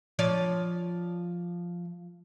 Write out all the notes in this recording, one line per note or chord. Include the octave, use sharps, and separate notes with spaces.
F3 C#5 D5